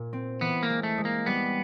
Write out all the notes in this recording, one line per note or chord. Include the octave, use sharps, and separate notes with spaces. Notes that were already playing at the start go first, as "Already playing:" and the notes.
Already playing: A#2
C4
E3 B3
A#3
G#3
A3
G#3
A#3
G3 B3